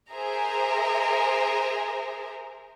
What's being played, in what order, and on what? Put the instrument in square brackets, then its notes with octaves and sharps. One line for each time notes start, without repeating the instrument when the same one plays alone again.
[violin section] G#4 A#4 C5 E5 A#5